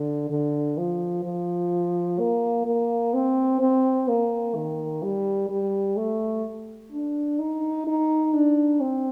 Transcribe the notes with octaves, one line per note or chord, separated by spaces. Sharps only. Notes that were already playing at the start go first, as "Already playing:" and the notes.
Already playing: D3
D3
F3
F3
A#3
A#3
C4
C4
A#3
D#3
G3
G3
A3
D4
D#4
D#4
D4
C4